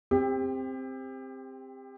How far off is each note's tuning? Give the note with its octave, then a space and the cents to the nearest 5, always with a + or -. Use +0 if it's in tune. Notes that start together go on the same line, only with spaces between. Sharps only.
C4 +0 G4 +30